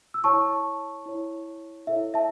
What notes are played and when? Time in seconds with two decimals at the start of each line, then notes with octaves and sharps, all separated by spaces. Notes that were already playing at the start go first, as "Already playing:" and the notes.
0.14 E6
0.24 E4 C#5 A5 C#6
1.06 E4 C#5
1.87 E4 A4 C#5 E5
2.14 E5 A5